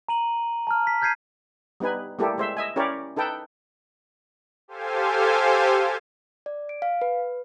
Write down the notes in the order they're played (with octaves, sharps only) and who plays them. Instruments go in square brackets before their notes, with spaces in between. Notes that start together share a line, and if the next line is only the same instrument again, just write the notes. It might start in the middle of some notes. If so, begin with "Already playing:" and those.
[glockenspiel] A#5 D#7 F#7
A5 A#5 F6
B6
F6 G6 G#6 B6 C7 D#7
[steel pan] G3 B3 D#4 B4 G#5
G3 A3 A#3 E4 G4 A4
G#3 C5 E5
D#5 E5 G#5
C#4 E4 G4 A#4 C#5 D5
D#4 A4 B4 G5 A5
[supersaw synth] G4 A4 C5 F5 G#5
[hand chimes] D5
D7
F5
B4